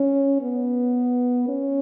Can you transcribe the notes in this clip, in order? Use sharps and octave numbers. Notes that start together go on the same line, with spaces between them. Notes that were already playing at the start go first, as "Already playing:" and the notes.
Already playing: C#4
B3
C#4